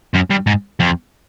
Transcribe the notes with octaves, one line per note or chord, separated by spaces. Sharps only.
F#2
G2
G#2
F2